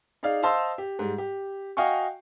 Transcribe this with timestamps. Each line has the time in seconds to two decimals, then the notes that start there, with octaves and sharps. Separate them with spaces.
0.23 D#4 G#4 D5 F5
0.43 C5 D#5 F5 A5 C6 E6
0.78 G4
0.99 G#2 G3
1.18 G4
1.77 F#4 D#5 F5 G5 G#5 C#6